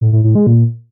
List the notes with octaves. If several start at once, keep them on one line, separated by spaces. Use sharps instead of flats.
A2
A2
A2
G#3
A#2